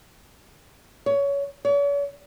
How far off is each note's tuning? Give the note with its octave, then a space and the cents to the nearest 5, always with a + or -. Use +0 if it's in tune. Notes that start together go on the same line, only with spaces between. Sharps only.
C#5 +20
C#5 +45